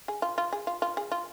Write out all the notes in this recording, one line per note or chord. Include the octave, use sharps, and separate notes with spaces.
G#4
F4
F4
G#4
F4
F4
G#4
F4